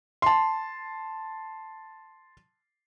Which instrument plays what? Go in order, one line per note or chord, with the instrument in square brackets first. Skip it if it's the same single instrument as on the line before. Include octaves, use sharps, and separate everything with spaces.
[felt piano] A5 C6